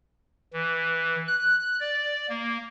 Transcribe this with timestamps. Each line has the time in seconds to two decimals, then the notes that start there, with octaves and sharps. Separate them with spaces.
0.53 E3
1.28 F#6
1.80 D5
2.29 A#3